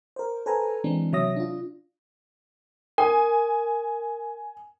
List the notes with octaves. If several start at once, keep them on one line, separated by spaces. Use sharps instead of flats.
A#4 C5
A4 B4 C5 G#5 A#5
E3 G#3 C4 D4
C3 F#3 C#5 E5 D#6 A#6
D4 F4
A#4 G#5